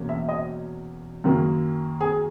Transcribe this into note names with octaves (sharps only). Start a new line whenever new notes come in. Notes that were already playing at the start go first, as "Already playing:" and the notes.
Already playing: E2 B2 A#3 C#4
E5
D#5
F#2 D#3 A#3
G#4